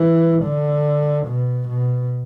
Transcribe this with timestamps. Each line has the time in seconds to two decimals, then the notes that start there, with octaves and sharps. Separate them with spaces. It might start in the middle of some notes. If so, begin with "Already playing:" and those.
Already playing: E3
0.43 D3
1.26 B2
1.68 B2